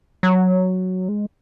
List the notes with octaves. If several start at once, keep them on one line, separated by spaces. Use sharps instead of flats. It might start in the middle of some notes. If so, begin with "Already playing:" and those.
F#3
G#3